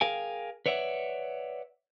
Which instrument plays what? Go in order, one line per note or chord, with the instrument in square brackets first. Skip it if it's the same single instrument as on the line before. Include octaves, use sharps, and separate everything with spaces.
[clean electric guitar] G#4 A#4 F5 G5 G#5
B4 C#5 D5 E5 F#5